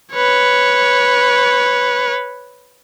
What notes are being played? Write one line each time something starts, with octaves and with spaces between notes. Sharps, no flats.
B4 C#5